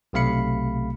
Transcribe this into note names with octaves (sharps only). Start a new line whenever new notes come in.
B1 C3 A3 F5 B5 C#7